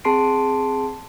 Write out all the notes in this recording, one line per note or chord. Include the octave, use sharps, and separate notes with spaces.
C4 G#4 A5 C6 C7 D7